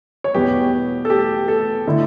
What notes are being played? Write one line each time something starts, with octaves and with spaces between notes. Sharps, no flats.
C#5
E2 B2 G3 G4 B4
A4
G4
A4
D3 A3 E4